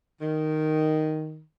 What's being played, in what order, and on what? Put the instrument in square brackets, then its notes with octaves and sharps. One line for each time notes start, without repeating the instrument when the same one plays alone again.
[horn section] D#3